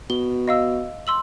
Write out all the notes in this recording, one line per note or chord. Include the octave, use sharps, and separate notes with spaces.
B2 G7
D#5 F5 E6
C6 E6 F#7